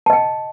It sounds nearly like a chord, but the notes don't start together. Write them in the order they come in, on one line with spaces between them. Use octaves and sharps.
A5 D#5 G5